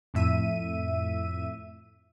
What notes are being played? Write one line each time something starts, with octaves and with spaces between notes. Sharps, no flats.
F2 A2 E5 D#7